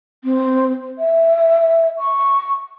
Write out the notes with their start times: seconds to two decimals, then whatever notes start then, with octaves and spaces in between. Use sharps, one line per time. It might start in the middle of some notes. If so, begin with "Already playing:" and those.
0.24 C4
0.98 E5
1.98 C#6